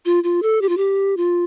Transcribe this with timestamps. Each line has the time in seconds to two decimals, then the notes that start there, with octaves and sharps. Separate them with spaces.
0.05 F4
0.24 F4
0.42 A4
0.61 G4
0.69 F4
0.77 G4
1.17 F4